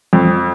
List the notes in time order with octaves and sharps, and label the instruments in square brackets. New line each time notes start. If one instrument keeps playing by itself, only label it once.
[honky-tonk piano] F2